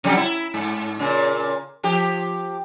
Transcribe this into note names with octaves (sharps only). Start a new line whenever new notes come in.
C3 F#3 G3
E4
G#2
A#2 C#3
F3 G4